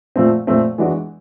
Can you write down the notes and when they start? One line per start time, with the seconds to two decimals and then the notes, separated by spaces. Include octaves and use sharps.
0.16 A#2 F3 A3 C4
0.47 A#2 F3 A3 C4
0.78 E3 G#3 B3 D4 F#4